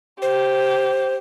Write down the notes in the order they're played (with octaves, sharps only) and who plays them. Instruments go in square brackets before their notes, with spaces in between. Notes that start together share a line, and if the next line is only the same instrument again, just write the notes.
[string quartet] G4 [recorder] C5